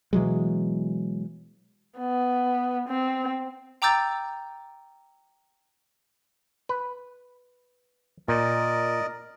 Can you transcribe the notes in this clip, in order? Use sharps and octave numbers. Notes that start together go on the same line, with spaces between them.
B2 E3 F#3 G#3
B3
C4
G5 A#5 D6 E6 G6 A6
B4
A#2 A#4 D5 D#5